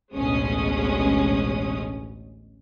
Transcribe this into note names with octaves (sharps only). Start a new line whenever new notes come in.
A1 D2 B2 G#3 C#4 D#6